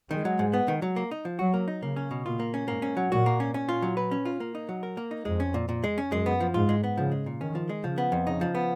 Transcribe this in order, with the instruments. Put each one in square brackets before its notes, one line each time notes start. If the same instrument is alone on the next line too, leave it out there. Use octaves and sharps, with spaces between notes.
[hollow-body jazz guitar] D#3 [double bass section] G#3
[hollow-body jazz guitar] F#3
G#2
B3
D#3
F#3
A#3
D#4
F3
[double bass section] F#3 [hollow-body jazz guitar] F#4
[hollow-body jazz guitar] A#3
D#4
[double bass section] C#3 [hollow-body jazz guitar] A#3
[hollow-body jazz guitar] C#4
B2
[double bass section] A#2 [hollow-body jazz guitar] F4
[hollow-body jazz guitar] A#3
C#4
[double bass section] G#2 [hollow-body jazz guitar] A#3
[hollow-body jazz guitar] C#4
F#3
[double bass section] A#2 [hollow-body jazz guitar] F#4
[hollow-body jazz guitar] A#3
C#4
C#4
F4
F#3
B4
C#4
F4
A#3
D#4
F#3
A#4
A#3
D#4
[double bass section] F2 [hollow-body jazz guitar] G#3
[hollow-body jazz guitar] C#4
A#2
A#2
G#3
C#4
[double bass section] F#2 [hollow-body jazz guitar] G#3
[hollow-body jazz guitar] B3
F3
[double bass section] G#2 [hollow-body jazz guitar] F4
[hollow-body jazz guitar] G#3
B3
[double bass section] C#3 [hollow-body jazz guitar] F3
[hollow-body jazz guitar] G#3
A#2
[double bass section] D#3 [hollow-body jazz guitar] C#4
[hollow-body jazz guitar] F3
G#3
[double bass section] C#3 [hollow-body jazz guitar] F3
[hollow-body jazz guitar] B3
F2
[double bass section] C#3 [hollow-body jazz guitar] D#4
[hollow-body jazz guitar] F3
B3